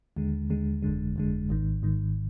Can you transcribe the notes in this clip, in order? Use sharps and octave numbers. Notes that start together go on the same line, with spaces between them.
D#2 D3 G#3
D#2 D3 G#3
G1 F2 D3 G#3
G1 F2 D3 G#3
G#1 G#2 D#3
G#1 G#2 D#3